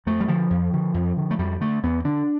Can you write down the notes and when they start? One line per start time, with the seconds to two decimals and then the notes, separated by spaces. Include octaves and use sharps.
0.06 F2 A3
0.20 G3
0.28 D3 F3
0.50 F2
0.73 D3
0.94 F2
1.17 D3
1.31 A3
1.38 F2 G3
1.60 D3 A3
1.83 E2 B3
2.04 D3 D4